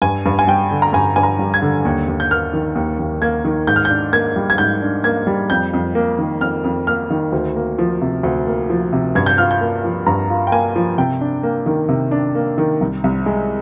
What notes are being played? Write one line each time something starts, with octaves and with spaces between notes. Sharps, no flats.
G2 G#5
G2
G#5
G3 G5
D3
A#5
G2 G#5
G2 G#5
A#5
G3
G#6
D3
D#2
D#2
G6
A#3 F6
D#3
D#2
D#2
A#3 G#6
D#3
G#2 G6
F6
G6
D4
A#3 G#6
G3
G#6
G#2 G6
D4
A#3 G#6
G3
F2 G6
F2
A#3
D#3
F2 F6
F2
A#3 F6
D#3
D2
A#3
F3
C3
D2
A#3
F3
C3
G2 G#6
G6
F4 F6
G6
A#3
F3
G2 A#5
F4
G5
A#3 G#5
F3
C3 G5
D4
A#3
D#3
C3
D4
A#3
D#3
C2
C2
G#3